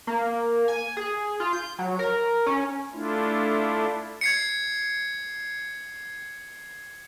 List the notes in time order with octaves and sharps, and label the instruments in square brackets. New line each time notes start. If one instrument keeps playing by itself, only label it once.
[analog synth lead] A#3
G#5
G#4
F4
G6
F#3
A#4
C#4
[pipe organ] A3 D4 E4 F4
[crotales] G#6 C7 C#7